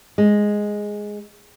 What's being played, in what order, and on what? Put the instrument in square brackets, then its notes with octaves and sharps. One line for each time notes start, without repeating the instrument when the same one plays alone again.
[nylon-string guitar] G#3